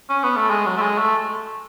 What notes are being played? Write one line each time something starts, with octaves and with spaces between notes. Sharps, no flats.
C#4
B3
A3
G#3
F#3
A3
G#3
A3